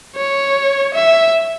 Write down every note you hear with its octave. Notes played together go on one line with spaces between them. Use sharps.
C#5
E5